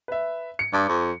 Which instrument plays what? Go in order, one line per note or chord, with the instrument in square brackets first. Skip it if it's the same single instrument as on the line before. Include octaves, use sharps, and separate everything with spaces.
[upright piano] B4 E5
C#7
[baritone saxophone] G2 [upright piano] D6
[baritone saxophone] F2